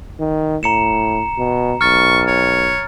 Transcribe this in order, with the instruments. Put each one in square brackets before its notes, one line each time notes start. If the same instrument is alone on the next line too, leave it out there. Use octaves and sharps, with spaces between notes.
[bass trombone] D#3
[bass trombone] A2 [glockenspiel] A#5 C#7 E7
[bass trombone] B2
[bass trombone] B1 [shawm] C#6 [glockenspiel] F6 A6
[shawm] C#5